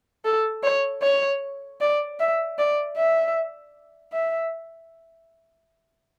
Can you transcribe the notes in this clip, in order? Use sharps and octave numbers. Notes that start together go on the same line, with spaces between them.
A4
C#5
C#5
D5
E5
D5
E5
E5